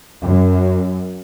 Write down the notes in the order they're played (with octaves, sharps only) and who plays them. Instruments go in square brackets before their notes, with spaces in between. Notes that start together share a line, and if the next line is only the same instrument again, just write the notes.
[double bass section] F#2